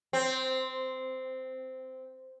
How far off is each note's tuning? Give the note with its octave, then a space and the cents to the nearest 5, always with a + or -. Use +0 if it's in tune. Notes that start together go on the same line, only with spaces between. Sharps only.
C4 -10